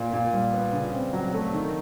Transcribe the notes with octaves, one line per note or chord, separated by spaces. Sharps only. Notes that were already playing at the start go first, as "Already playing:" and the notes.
Already playing: A#2
A#2
G3
B3
C#3
C4
F#3
A3
D#3